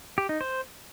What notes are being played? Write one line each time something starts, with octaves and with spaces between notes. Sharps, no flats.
G4
D#4
C5